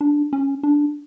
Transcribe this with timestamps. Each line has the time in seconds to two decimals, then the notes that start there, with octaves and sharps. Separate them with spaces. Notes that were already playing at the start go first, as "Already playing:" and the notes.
0.01 D4
0.33 C#4
0.63 D4